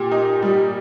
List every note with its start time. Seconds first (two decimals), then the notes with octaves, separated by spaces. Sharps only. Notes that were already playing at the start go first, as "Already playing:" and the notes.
Already playing: A#2 G4
0.11 D#4
0.42 G3